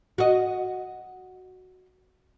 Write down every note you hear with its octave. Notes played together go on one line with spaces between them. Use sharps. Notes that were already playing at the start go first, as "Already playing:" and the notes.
F#4 D#5